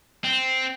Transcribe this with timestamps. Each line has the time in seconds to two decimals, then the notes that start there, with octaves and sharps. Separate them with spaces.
0.24 C4